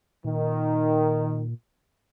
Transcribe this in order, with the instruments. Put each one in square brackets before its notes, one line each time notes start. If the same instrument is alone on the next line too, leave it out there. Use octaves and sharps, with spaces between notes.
[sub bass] A#2 [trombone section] D#3